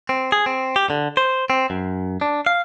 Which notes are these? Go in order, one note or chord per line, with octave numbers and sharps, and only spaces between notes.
C4
G#4
C4
G4
D3
C5
C4
F#2
D4
F5